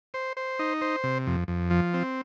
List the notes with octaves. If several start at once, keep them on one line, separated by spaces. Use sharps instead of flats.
C5
C5
D#4
C5
C3
F2
F2
F3
C4